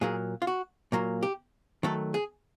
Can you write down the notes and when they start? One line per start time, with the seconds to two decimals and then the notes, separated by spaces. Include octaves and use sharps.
0.01 A#2 F#3 A#3 G#4
0.42 F4
0.47 F#4
0.92 A#2 F#3 A#3
1.23 G4
1.83 D#3 F#3 A3 A4
2.14 G#4